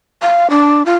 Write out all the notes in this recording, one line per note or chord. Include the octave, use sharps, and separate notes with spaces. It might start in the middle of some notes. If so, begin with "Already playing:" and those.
F5
D4
F4